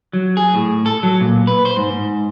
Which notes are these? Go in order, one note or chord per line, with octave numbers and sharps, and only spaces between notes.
F#3
G#4
A2
A4
F#3
A#2
B4
C5
G#2
G#2